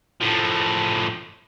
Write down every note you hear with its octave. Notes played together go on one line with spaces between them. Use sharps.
A2 F3